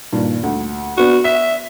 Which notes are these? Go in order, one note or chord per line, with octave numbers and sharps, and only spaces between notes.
G2 A#2 D#3
D2
B3 D4 F#4
E5 B6